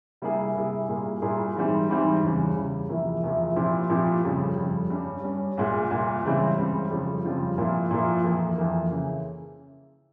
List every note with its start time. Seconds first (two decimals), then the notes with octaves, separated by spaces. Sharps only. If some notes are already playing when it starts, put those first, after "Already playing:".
0.22 C3 G3 A#3 E4 G#4
0.55 C3 G3 A#3 E4 G#4
0.89 A#2 G3 A#3 E4 G#4
1.22 A#2 G3 A#3 E4 G#4
1.56 G#2 E3 G3 C4
1.89 G#2 E3 G3 C4
2.23 E2 C#3 G3
2.56 E2 C#3 G3
2.89 E2 C3 F3 A#3 E4
3.23 E2 C3 F3 A#3 E4
3.56 A#2 F3 C4 E4 G4
3.90 A#2 F3 C4 E4 G4
4.24 F2 C#3 G3
4.56 F2 C#3 G3
4.90 G2 G3 C#4
5.23 G2 G3 C#4
5.57 C2 A#2 G#3
5.90 C2 A#2 G#3
6.24 C#2 C#3 E3 G3 C4
6.57 C#2 C#3 E3 G3 C4
6.91 F2 C#3 G3 C4 F4
7.25 F2 C#3 G3 C4 F4
7.58 A#2 F3 A#3 E4
7.91 A#2 F3 A#3 E4
8.24 F2 E3 A#3
8.58 F2 E3 A#3
8.91 C#3 E3